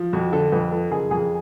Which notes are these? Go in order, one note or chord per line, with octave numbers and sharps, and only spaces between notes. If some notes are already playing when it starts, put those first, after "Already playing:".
Already playing: F3
F2 F#4
D3 A4
F2 B4
F3 A4
F#1 G#4
F2 G#4